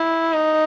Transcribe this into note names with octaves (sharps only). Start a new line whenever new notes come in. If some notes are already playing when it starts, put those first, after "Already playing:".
Already playing: E4
D#4